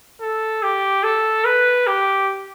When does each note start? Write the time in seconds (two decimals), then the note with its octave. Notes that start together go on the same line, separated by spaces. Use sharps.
0.21 A4
0.63 G4
1.03 A4
1.45 B4
1.87 G4